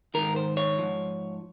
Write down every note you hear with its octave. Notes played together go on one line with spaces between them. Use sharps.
G#2 D#3 A#4
C5
C#5
G#2 F3